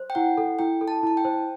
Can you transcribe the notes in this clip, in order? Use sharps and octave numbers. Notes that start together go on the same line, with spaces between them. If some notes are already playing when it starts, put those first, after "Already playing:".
Already playing: C5
G5
E4 F#5
A4
E4 G5
A4
A5
E4 A5
G5
C5